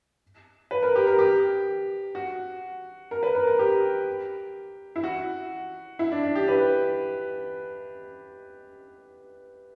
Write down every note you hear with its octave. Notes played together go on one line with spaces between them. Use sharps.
B4
A#4
G4
A#4
G4
F#4
A#4
B4
A#4
A#4
G4
E4
F#4
E4
D4
D4
G4
B4